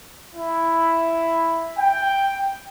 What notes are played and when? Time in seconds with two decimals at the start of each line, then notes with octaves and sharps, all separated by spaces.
0.35 E4
1.78 G5